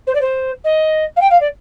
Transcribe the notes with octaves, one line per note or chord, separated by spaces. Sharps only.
C5
D5
C5
D#5
F5
G5
F5
D5